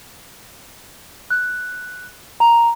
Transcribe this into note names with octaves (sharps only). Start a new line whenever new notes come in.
F#6
A#5